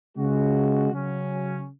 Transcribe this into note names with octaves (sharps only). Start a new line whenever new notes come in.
C#3 G#3 F#4
C#3 F#3 C#4